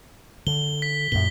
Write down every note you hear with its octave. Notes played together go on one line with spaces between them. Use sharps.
D3 G7
B6
F#2 A#2 G7